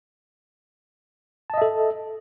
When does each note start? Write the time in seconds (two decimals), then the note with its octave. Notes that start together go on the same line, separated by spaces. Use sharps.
1.50 A5
1.54 D#5
1.58 E5
1.62 A4